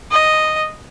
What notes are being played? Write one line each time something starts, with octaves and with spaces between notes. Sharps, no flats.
D#5